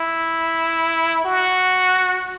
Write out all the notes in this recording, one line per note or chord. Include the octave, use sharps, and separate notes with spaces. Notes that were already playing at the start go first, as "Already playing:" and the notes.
Already playing: E4
F#4